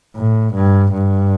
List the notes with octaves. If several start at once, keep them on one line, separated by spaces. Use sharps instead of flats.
A2
G2
G2